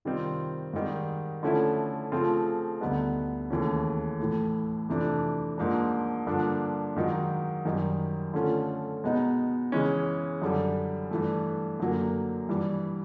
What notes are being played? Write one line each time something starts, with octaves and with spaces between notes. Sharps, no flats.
C3 D#3 G3 C4 F4
G#2 D#3 G3
D3 F3 A3 C#4 E4
C#3 F3 A3 C4 F4
D2 D3 G3 B3 D#4
D#2 C#3 E3 A3 C#4
A2 E3 A3
F2 C3 E3 A3 D4
G#2 F3 A#3 D4
G2 D3 F3 A#3 D4
G#2 D#3 F#3
F#2 D#3 G3
D3 F3 A3 C#4 F4
B2 G#3 B3 D#4
C#3 E3 G#3 C#4
F#2 D3 G3
G2 E3 A3
F#2 D3 F#3 A#3
G2 E3 G3